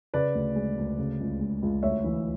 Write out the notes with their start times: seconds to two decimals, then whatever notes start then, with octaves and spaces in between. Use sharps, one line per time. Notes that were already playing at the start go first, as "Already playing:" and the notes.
0.14 C#3 B4 D5
0.35 D2
0.56 G#3
0.77 D2
0.98 C#3
1.20 C#2
1.41 G#3
1.63 C#2
1.83 D2 C#5 E5
2.04 E3